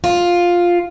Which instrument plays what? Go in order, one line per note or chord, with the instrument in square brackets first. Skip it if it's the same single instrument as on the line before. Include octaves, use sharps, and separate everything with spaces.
[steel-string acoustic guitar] F4